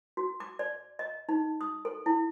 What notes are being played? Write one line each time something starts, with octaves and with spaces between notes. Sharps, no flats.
F#4
D6
D5
D#5
D#4
D#6
A4
E4